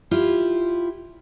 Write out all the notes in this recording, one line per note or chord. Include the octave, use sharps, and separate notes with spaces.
E4 F4 G4